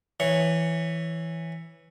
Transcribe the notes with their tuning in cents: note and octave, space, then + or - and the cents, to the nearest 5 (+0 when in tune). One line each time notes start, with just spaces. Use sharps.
E3 +0 C#5 +0